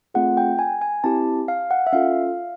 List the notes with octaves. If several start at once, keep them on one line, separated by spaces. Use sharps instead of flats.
A3 C4 F4 G#4 F#5
G5
G#5
G#5
C4 E4 G4 A5
F5
F#5
E5
C#4 F4 A4 F5